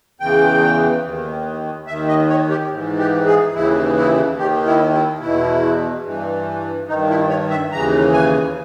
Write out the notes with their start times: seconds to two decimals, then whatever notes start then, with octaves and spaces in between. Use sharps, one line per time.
0.20 E2 C#3 E3 G5
1.04 D#2 D#3
1.87 D#2 D#3 E5
2.08 D#5
2.29 C#5
2.50 G4
2.71 G#2 E3
2.98 G4
3.26 G#4
3.55 D#2 C#3 E3 E4
3.96 E4
4.37 D#2 D#3 G4
4.66 E4
4.93 E4
5.20 E2 B2 E4
6.05 G2 E3
6.88 G2 D#3 D#4
7.09 E4
7.29 C#5
7.50 E5
7.72 D#2 C#3 E3 A#5
8.13 G#5